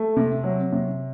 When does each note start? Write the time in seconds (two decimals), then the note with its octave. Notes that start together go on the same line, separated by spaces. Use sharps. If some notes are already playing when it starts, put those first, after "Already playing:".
Already playing: A3
0.17 C3
0.44 F#3
0.72 C3